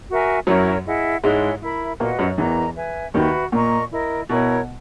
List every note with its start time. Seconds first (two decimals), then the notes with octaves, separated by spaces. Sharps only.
0.09 F#4 A#4 E5 G#5
0.47 F#2 F#3 C#4 E4 A#4 C#5
0.85 E4 G#4 D#5 F#5
1.23 G#2 G#3 E4 G#4 C#5
1.62 E4 A#4 E5 B5
2.00 A#2 A#3 F#4 B4 D#5 F#5
2.19 F#2 F#3
2.37 E2 E3 A#4 D#5 A#5
2.76 B4 E5 G#5
3.14 D#2 D#3 F#4 B4 E5 B5
3.52 A#2 A#4 D#5 A#5 C#6
3.91 E4 A#4 D#5
4.29 B2 E4 A#4 C#5